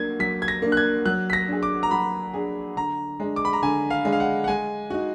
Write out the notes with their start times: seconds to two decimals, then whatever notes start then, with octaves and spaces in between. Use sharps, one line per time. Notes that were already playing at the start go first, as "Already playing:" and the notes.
Already playing: F#3 A#3 D4 G#6
0.19 F#3 B6
0.42 G#6
0.48 A#6
0.62 A#3 D4
0.72 F#6
0.77 G#6
1.05 F#3 F#6
1.30 B6
1.33 A#6
1.47 D4 G#4
1.63 D6
1.83 A#5
1.91 F#3 B5
2.34 D4 G#4
2.76 D3 A#5
3.20 G#3 D4
3.36 D6
3.45 B5
3.53 A#5
3.63 D3 G#5
3.90 F5
4.05 G#3 D4
4.12 F5
4.20 F#5
4.44 F#5
4.48 G#3 G#5
4.90 D#4 F#4